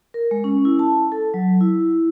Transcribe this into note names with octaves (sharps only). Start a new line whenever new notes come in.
A#4
G#3
C#4
E4
A5
A4
F#3
E4